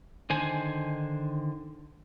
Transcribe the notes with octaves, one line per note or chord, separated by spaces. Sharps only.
D3 D#3 C5 G#5